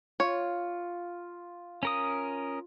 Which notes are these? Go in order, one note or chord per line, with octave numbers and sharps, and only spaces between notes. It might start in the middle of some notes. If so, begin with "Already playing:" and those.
F4 C#5
C#4 A#4 D#6